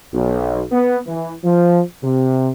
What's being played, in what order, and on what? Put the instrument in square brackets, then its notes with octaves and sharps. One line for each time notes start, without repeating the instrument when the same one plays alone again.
[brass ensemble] B1
B3
E3
F3
C3